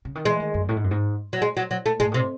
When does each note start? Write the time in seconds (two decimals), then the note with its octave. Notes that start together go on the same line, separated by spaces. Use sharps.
0.05 C#3
0.15 D#3
0.25 E3 G#3
0.40 D#3
0.54 F#2
0.69 A2
0.76 G#2
0.84 F#2
0.91 G#2
1.33 F#3
1.42 G#3
1.57 F#3
1.71 F#3
1.86 A3
2.00 G#2 G#3
2.12 A2 C3